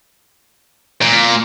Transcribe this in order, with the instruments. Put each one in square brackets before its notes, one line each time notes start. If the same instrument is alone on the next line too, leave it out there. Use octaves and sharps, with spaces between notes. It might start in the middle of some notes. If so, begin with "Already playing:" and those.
[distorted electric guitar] A#2